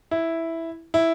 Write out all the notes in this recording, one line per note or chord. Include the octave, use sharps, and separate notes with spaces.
E4
E4